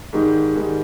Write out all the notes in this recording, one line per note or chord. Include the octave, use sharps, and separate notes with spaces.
G#2 D#3 G3
G#2 D#3 G3